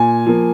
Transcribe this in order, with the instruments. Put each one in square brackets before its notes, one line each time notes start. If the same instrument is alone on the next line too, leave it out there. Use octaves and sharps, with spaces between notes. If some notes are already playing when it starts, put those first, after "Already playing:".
Already playing: [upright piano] A#2 G#5
F3 A#3